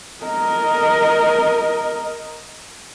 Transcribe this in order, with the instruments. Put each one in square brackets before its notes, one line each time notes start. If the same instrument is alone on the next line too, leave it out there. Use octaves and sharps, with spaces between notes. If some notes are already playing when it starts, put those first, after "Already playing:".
[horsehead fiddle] A#4 D#5